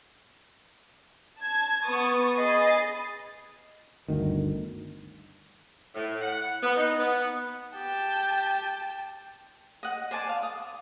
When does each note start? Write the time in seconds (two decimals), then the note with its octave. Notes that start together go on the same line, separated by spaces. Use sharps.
1.40 A5 G#6
1.86 B3 B4 C#6 D#6 A6
2.37 G#4 D#5 B5 D#6 A6 C7
4.08 G1 D2 D#3
5.95 A2
6.22 F#5
6.63 B3
6.77 D#4
6.99 B3
7.75 G4 G5 A5
9.83 D#5 F#5
10.11 C5 D5 G#5 A5
10.29 F5
10.43 D#6